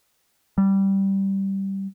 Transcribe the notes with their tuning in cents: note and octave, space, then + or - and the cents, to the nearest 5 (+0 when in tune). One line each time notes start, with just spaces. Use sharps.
G3 -10